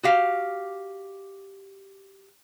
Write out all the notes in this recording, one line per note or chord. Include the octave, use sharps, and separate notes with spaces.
F#4 G4 F5